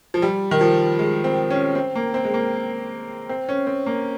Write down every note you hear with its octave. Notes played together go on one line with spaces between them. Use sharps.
F3
G3
D#3
F3
G#3
C4
C#4
C4
A#3
C4
G#3
A#3
C4
C#4
C4
A#3